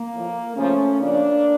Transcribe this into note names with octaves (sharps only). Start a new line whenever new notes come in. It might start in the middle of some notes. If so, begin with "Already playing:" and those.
Already playing: A#3
A2 F3
C#3 F3 A3 C#4
C#3 F3 A#3 D4